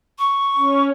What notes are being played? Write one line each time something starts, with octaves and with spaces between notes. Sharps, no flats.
C#6
C#4